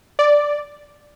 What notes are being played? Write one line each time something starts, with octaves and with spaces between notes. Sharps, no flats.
D5